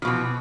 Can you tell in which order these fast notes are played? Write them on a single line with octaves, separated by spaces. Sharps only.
F3 B2 E3